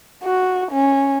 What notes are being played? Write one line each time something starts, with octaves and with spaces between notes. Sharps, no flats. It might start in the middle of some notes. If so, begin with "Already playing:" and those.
F#4
C#4